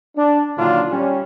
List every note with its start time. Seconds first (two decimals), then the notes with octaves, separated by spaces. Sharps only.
0.17 D4
0.58 A#2 D3 D#3 F#3 D4 F4
0.91 G3 C#4